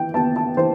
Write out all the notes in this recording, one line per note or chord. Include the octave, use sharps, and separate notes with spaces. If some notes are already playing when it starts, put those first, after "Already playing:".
Already playing: E3 G5
B3 A5
A5
E3 C5